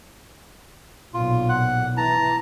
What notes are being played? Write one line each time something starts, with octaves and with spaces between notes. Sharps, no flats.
B1 A#2 F4
F#5
E3 A5 A#5